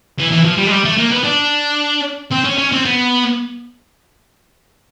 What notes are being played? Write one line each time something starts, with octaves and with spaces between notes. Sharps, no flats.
E3
E3
F3
G3
G#3
G3
A3
A#3
B3
D4
C4
C#4
C#4
C4
B3